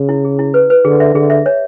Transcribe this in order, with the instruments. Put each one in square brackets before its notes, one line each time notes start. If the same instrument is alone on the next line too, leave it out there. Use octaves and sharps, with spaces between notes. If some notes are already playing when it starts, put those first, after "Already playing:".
Already playing: [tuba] C#3
[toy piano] E4
G#4
E4
B4
B4
[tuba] D3 [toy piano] G#4
[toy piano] E5
[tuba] D3 [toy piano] G#4
[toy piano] E5
C#5